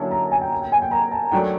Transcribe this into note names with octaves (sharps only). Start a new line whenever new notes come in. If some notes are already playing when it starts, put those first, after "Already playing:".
Already playing: D3 F#3 A#3 C#4 E4 A5
A#5
G#5
G5
G5
G#5
G5
A#5
A5
D#3 F#3 A3 D4 G5